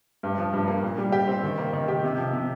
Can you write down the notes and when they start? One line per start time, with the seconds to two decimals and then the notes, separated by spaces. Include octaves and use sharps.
0.23 G2
0.38 F3
0.53 G2
0.68 A#3
0.84 A#2
0.98 G3
1.12 G4
1.27 C4
1.43 D#3
1.58 A#3
1.73 D#3
1.88 G4
2.04 C3
2.18 F3
2.33 C3